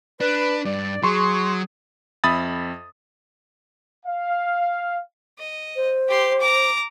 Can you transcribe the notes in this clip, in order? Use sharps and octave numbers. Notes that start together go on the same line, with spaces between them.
D4 B4
G2 D5
F#3 G#4 C6 C#6
F2 E5 B5 D#6 A6
F5
D#5
C5
G4 C6
A#5 D6